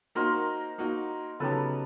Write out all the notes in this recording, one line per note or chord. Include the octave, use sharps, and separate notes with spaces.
A#3 D#4 F#4 A#4 C5
A#3 D#4 F#4
C#3 F#3 B3 D#4 G4 A4 B4